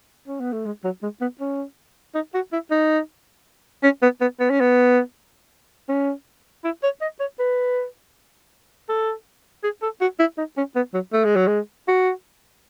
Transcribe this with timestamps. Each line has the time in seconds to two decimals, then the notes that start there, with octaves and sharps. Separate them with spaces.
0.28 C#4
0.40 B3
0.53 A3
0.66 G#3
0.84 F#3
1.03 G#3
1.21 B3
1.41 C#4
2.15 D#4
2.35 F#4
2.53 E4
2.71 D#4
3.83 C#4
4.02 B3
4.21 B3
4.40 B3
4.50 C#4
4.61 B3
5.89 C#4
6.65 E4
6.83 C#5
7.02 D#5
7.20 C#5
7.39 B4
8.89 A4
9.64 G#4
9.82 A4
10.01 F#4
10.19 E4
10.38 D#4
10.57 C#4
10.76 B3
10.94 F#3
11.13 A3
11.25 G#3
11.36 F#3
11.48 G#3
11.88 F#4